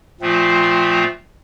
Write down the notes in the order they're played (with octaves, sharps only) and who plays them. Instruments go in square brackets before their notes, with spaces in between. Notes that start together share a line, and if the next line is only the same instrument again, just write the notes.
[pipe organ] A#2 F3 A3 C4 F4